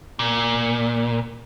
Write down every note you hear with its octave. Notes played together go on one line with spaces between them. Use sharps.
A#2